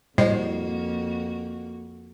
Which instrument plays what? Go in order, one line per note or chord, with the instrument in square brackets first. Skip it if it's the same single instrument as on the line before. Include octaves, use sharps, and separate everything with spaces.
[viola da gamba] F2 A#3 F#4 [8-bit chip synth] A2 [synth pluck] G3 [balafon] E4 C5 D#5